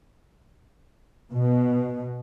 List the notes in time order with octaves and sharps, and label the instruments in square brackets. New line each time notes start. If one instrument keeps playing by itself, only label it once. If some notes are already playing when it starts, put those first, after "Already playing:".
[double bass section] B2